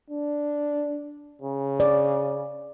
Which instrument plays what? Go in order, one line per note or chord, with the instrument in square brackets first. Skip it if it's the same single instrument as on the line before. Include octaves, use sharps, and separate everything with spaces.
[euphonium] D4
C#3
[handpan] D5